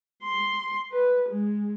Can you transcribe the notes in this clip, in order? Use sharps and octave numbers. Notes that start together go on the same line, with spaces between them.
C6
B4
G#3